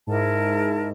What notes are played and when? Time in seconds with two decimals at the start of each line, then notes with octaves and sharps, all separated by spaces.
0.07 G#2 E4 A#4 A5